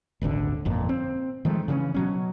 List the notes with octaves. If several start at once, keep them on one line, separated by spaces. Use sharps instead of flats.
D#1 G#1 D2 D3
G1 F2 A#2
C4
D#3 F3 G#3 A3
C#3 E3 B3 C#4
B2 F#3 C#4